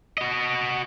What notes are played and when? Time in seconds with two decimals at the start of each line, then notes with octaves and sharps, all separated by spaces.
0.18 F#4 D#5